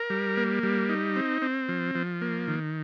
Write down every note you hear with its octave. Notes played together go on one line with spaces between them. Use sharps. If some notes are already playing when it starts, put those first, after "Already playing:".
Already playing: A#4
G3
A#3
G3
D#4
C4
C4
F3
F3
A#3
D#3